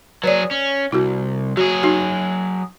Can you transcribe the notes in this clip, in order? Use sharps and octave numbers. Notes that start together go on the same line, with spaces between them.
F#3 G#4 B4 C#5 D5
C#4
C2 E4 F#4
F#3 F#4 G#4
D#4 F#4